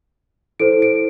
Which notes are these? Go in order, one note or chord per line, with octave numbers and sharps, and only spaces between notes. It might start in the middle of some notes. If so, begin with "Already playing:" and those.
E4 A4 C5 D7
D7